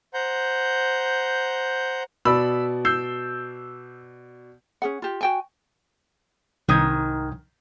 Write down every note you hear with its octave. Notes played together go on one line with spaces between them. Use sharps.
C5 F#5 A#5 G6
B2 D5 B5 E6
E6 G6 C7
C#4 G#4 F#5
F4 G4
F#4 G5 G#5
C2 G#2 D#3 D#6 G#6